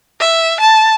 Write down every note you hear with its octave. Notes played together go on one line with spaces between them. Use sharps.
E5
A5